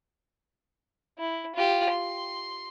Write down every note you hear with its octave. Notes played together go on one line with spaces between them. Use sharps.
E4
F4 G4
C6